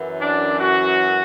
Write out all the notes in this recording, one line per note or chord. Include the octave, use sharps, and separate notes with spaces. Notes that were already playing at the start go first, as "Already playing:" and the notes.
Already playing: F#2 E3
D4
F#4